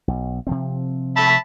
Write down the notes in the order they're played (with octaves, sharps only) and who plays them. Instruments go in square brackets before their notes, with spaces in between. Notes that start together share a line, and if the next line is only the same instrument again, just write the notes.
[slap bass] B1
C3 F3 C4
[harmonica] E5 A5 B5